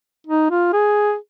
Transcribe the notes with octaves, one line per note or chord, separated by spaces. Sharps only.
D#4
F4
G#4